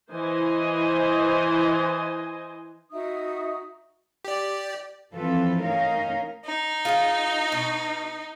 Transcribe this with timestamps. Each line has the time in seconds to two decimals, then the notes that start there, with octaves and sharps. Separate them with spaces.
0.11 E3 C5 D#5 G#5
2.91 D#4 F#4 E5 D#6
4.25 G4 D5
5.14 E3 F3 C4 F4 A4 B4
5.62 A3 C#4 D#4 A#4 F5
6.45 D#4
6.85 F4 G#4 F5
7.52 B2